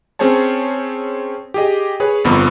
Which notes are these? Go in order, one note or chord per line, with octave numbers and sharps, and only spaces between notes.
C4 C#4 G#4 C5 C#5 A5
G4 G#4 D#5
G#4 B4 C#5
G1 F2 B3 A#5